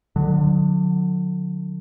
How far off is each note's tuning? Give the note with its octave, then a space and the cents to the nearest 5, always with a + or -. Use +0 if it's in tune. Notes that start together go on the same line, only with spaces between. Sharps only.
D3 +25 F#3 -30